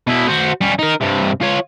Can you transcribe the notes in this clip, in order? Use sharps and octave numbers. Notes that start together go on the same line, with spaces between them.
B2 E4
F#4 C5
G3 C#4
D#4 A#4
G2 C3
F4 C#5